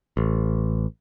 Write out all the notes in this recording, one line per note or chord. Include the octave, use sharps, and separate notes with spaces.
A1